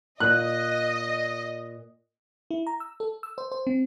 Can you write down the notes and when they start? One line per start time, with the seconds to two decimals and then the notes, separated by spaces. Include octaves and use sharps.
0.20 A#2 D#5 F#6
2.51 E4
2.67 A#5
2.80 E6
3.00 A4
3.23 E6
3.38 C5
3.52 C5
3.67 C4